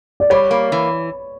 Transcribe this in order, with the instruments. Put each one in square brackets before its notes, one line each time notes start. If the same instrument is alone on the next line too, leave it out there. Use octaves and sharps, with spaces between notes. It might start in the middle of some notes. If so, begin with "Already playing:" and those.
[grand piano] D5
[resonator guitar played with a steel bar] G3 [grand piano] C#5
[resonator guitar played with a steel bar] A#3
E3